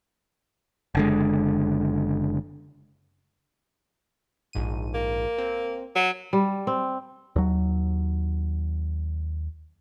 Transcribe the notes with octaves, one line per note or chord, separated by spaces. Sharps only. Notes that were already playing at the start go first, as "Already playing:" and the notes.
F#1 D3 G#3
A#1 G#2 D#7
A#3
C4
F#3
G3
C4
D#2 F#3